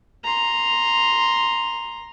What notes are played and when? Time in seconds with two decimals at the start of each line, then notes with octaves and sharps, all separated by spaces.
0.24 A#5 C6